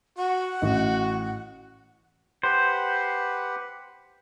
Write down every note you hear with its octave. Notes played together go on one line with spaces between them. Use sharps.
F#4 F#5
A1 F#4 D#5
G4 B4 C5 F#5